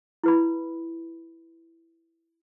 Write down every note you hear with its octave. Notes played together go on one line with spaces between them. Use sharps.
E4 B4 B5